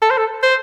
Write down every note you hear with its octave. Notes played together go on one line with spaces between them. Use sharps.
A4
C5
A4
C5